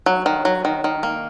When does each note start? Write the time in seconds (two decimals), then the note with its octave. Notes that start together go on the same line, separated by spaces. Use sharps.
0.06 F#3
0.26 D#3
0.45 F#3
0.65 D#3
0.84 D#3
1.03 A#3